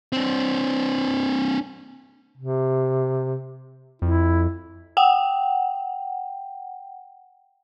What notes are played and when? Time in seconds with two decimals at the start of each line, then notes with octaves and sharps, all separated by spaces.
0.13 C4 D4
2.37 C3
4.02 F2 E4
4.97 F#5 G5